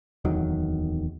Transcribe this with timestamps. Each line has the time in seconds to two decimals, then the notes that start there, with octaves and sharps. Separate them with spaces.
0.25 D1 E2 D#3 F#3